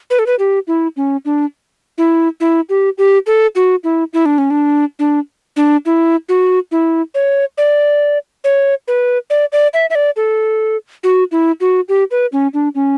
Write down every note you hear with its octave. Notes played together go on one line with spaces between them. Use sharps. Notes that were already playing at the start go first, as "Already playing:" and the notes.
B4
A4
B4
G4
E4
C#4
D4
E4
E4
G4
G4
A4
F#4
E4
E4
D4
C#4
D4
D4
D4
E4
F#4
E4
C#5
D5
C#5
B4
D5
D5
E5
E5
D5
A4
F#4
E4
F#4
G4
B4
C#4
D4
C#4